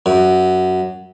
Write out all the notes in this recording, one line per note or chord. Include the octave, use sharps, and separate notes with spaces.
F#2